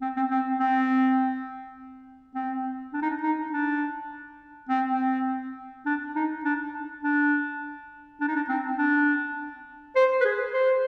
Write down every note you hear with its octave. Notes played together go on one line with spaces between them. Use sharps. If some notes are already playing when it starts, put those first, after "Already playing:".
C4
C4
C4
C4
C4
D4
D#4
D4
D#4
D4
C4
C4
D4
D#4
D4
D4
D4
D#4
D4
C4
D4
C5
B4
G#4
C5